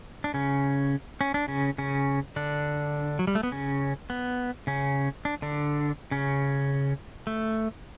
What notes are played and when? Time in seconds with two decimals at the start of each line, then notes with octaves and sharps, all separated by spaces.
0.24 D4
0.34 C#3 C#4
1.21 C#4
1.34 D4
1.48 C#3 C#4
1.78 C#3 C#4
2.36 D3 D4
3.19 F#3
3.27 G3
3.35 A3
3.43 B3
3.52 C#3 C#4
4.10 B3
4.67 C#3 C#4
5.25 D4
5.42 D3 D4
6.11 C#3 C#4
7.27 A3